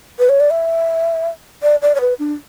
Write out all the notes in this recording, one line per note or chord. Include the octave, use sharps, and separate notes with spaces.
B4
C#5
D5
E5
D5
D5
C#5
B4
D4